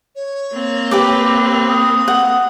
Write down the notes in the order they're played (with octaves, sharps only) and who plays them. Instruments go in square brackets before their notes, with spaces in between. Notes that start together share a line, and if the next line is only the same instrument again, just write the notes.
[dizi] C#5
[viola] A#3 C4
[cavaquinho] G4 B4 D6
[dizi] D#6
[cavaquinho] F#5